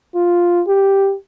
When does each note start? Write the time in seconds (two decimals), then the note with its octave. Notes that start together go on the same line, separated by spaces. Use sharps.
0.15 F4
0.67 G4